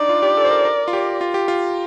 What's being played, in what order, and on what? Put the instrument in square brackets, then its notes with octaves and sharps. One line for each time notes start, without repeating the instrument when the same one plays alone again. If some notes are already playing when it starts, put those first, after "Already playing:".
Already playing: [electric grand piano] D4 D#4 [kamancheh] D5
[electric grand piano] F4
G4
A4
C5
A#4
A#4
F4
G4
F4
G4
F4